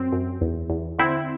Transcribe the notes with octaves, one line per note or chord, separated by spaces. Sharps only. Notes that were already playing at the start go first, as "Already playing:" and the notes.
Already playing: F#2 C4
F#2
E2
E2
D3 C4 E4